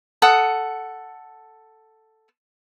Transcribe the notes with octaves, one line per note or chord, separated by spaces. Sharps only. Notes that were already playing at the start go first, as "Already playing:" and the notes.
A4 F#5 D#6